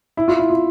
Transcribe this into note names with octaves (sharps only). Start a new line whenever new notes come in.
E4
F4
E4
F4